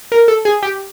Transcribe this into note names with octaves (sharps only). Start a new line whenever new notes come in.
A#4
A4
G#4
G4